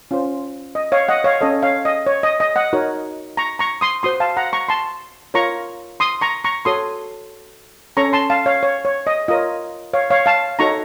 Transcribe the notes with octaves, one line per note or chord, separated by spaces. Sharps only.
C#4 F4 C5
D#5
C#5 F5
D#5 F#5
C#5 F5
C#4 A4 C#5 D#5
C#5 F5
D#5
C#5
D#5
D#5
D#5 F#5
D#4 F#4 A#4 C#5
A#5 C#6
A#5 C#6
C6 D#6
F#4 C5 C6 D#6
F5 A5
F#5 A#5
A#5 C#6
A5 C6
F4 A#4 C#5 A#5 C#6
C6 D#6
A#5 C#6
A#5 C#6
F#4 A4 C#5 C6 D#6
C#4 A4 C#5 A#5 C#6
A5 C6
F5 A5
C#5 F5
C#5
C#5
D#5
F4 A#4 C#5 D#5
C#5 F5
C#5 F5
F5 A5
D#4 F#4 A4 C#5 A#5 C#6